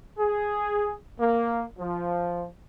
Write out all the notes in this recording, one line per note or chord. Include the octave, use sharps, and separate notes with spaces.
G#4
A#3
F3